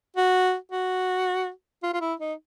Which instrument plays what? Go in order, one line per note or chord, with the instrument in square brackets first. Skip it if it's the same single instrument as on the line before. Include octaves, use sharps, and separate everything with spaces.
[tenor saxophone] F#4
F#4
F4
F4
E4
D#4